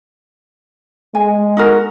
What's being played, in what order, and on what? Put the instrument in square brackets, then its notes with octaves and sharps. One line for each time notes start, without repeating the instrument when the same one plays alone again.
[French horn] G#3 [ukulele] G#5
[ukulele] D#4 F#4 A#4